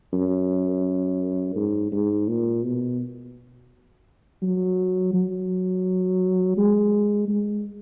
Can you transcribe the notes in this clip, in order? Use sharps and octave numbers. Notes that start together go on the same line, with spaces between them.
F#2
G#2
G#2
A#2
B2
F#3
F#3
G#3
G#3